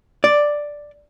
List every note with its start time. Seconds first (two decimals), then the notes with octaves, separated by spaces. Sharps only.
0.24 D5